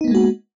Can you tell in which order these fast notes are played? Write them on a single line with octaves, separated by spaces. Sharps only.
D#4 B3 A#3 G#3 F#4